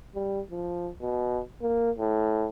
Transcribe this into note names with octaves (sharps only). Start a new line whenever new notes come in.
G3
F3
B2
A#3
A2